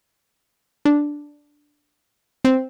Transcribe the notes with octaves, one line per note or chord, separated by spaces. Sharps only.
D4
C4